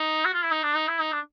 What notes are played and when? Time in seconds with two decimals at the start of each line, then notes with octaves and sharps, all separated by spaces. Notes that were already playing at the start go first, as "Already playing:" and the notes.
Already playing: D#4
0.25 F#4
0.34 F4
0.43 E4
0.52 D#4
0.63 D4
0.76 D#4
0.88 E4
1.00 D#4
1.13 D4